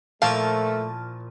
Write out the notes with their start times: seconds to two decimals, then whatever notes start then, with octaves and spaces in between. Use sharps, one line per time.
0.22 A#2 F3 A3 E4 F5 A5 C#6 F6